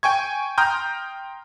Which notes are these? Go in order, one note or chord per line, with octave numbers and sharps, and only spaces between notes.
G5 G#5 C#6 G#6
G5 A#5 C6 D#6 F6 G6